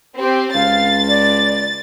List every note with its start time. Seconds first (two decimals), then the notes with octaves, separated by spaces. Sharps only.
0.19 C4 G4
0.55 C#2 F5 A6
1.09 D5